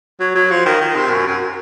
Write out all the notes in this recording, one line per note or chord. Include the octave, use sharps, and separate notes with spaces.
F#3
F#3
F3
D#3
D#3
C3
F#2
F#2